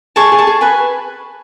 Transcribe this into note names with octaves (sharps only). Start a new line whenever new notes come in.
G#4 A5 C#6
G#4
A5 C#6
G#4
B4 G#5 B5